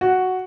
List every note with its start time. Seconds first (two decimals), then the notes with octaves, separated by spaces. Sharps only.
0.01 F#4